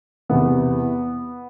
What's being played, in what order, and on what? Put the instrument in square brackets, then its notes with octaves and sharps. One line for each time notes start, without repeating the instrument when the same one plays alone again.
[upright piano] E2 C3 E3 B3